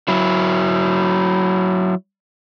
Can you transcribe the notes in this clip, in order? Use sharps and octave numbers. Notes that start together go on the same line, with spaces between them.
F#3 E4